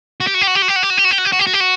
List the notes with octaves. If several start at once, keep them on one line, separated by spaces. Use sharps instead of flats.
F#4
G4
F#4
G4
F#4
G4
F#4
G4
F#4
G4
F#4
G4
F#4
G4
F#4
G4
F#4
G4
F#4
G4
F#4